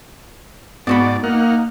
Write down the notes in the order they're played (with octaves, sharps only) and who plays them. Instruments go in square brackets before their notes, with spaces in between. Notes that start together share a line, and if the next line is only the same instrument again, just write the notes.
[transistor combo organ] G#2 D5 [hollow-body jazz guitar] B3 F#4 B5
[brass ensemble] A#3 [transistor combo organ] D#4 F#5 F6